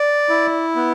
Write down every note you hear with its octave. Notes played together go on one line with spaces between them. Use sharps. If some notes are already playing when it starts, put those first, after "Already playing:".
Already playing: D5
E4
B3